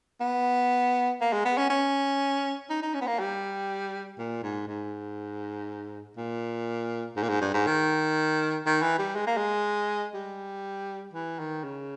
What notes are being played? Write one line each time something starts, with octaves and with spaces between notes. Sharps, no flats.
B3
A#3
G#3
B3
C#4
C#4
D#4
D#4
C#4
B3
A#3
G3
A#2
G#2
G#2
A#2
G#2
A#2
G#2
G2
G#2
D#3
D#3
E3
G3
G#3
A#3
G#3
G3
E3
D#3
C#3